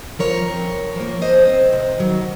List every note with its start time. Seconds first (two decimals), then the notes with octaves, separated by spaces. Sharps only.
0.19 F3 A#4 C#5
0.46 C4
0.71 C#3
0.96 F3 A#3
1.21 F3 C5 D#5
1.47 C4
1.73 C3
1.98 D#3 F#3